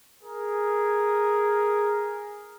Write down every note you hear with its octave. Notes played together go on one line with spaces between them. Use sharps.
G#4 A#4